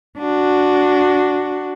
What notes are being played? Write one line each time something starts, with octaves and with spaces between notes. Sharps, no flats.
D4 F#4